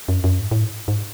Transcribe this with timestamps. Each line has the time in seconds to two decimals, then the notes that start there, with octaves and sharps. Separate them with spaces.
0.08 F#2
0.24 F#2
0.40 G#2
0.51 A2
0.61 G#2
0.88 G#2